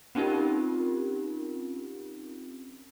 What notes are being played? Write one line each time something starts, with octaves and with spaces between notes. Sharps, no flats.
C4 C#4 D#4 F4 G4 A#4